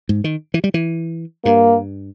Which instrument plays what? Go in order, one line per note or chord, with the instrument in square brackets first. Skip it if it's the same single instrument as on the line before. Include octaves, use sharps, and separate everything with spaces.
[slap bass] G#2
D#3
E3
G3
E3
[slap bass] G2 [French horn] A#3